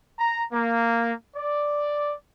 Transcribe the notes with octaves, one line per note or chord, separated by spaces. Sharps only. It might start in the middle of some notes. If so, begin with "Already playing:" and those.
A#5
A#3
D5